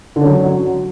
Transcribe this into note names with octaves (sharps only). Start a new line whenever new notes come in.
D3
C#4
F#3